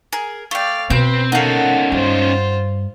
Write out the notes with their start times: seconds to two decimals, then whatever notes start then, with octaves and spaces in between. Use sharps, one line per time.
0.12 G#4 A#4
0.51 A3 D5 F5 G5
0.90 B2 C4 B4 G6
1.32 C#4 D#4 A4 A#4 F5 F#5
1.92 G2 F4 C5